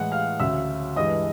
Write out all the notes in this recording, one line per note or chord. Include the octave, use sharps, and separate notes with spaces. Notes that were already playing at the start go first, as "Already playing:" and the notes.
Already playing: A2 E3 G#3 F#5 F#6
F5 F6
D2 C#3 F#3 E5 E6
G2 E3 G#3 D#5 D#6